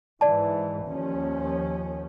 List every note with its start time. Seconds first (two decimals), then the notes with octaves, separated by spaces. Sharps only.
0.21 G#2 E3 D5 A5
0.86 D#2 F3 C#4